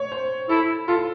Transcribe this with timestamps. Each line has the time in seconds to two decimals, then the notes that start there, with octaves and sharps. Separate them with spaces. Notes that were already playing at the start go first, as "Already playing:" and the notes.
Already playing: C#5
0.12 C5
0.49 E4 A4
0.88 F4 A4